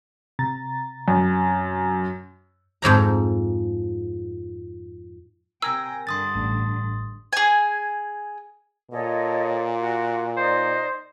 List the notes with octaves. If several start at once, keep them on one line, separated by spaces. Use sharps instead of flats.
C3 A#5 A6
F#2
F2 G#2 F3 A#5
C3 A#4 G5 G#5 E6 A#6
G2 D3 C6 D#6 A6
A1
G#4 G#5
A#2 A4 C#5 D#5
F#4
D#4 C5 D5